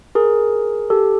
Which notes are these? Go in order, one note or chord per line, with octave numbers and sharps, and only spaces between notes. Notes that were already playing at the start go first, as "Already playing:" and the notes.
G#4 A#4
G4 A4